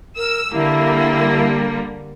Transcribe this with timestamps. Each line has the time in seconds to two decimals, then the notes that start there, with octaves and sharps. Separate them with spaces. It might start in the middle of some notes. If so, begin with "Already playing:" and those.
0.17 A#4 E6
0.52 D3 G3 A#3 E4